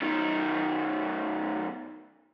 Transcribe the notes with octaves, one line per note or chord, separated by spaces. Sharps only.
F#2 D#3